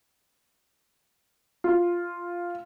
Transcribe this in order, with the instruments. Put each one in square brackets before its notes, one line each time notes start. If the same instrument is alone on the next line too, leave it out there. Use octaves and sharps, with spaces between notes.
[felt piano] F4